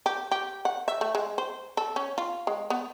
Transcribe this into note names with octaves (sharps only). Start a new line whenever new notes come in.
G4
G4
F#5
E5
A3
G#3
C5
A4
C#4
F4
G#3
B3